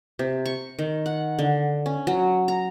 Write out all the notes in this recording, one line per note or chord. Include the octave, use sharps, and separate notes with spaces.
C3
C#6
D#3
F#5
D3
C#4
F#3
A#5